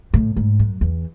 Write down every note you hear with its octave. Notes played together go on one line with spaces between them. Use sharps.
A2
G#2
F#2
E2